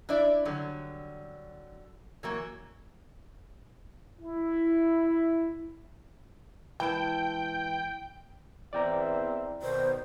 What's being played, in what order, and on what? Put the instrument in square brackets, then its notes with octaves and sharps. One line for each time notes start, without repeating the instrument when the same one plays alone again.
[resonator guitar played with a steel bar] D4 E4 D5 E5
D3 F#3 G3
E3 F#3 A#3
[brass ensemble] E4
[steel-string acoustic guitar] E3 G#3 A5 [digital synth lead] G5
[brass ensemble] E2 C4 E5 [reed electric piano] D5 G5 A#5
[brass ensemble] B2 D#3 [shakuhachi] C5